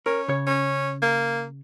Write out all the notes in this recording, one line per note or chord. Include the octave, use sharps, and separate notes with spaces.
C#4 A#4
C#3 C#5
C#4
A#3